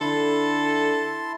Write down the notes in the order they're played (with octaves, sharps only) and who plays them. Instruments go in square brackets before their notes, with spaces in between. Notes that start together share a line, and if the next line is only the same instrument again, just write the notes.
[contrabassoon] D3 [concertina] E4 A5 C6 [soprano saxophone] A4